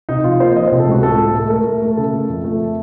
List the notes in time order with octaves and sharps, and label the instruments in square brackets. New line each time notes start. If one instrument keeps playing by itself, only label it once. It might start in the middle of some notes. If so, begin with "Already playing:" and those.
[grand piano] C3 D#4
F3 F4
A#3 C5
F3 D#5
C5
C3
A4
C#2 F#4
A2 A4
A2
A3 A4
A3 A#4
A3
A3
C#3 A4
A3
F2
A3